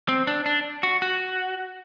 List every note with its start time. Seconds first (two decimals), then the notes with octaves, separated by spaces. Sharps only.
0.08 C4
0.27 D4
0.46 D4
0.83 F#4
1.02 F#4